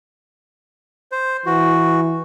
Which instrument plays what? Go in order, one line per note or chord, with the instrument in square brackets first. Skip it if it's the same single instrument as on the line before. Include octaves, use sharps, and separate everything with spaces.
[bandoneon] C5
[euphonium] E3 [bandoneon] F#4